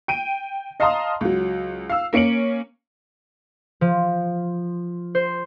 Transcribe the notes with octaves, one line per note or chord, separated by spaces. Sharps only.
G5 D7 D#7
D#5 F5 A5 A#5 C6 D#6
C#2 F#3
F5 E6
A#3 C#4 C#7 D7 F#7
F3
C5